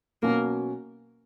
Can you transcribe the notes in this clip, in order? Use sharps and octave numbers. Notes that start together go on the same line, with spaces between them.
B2 F#3 A#3 C#4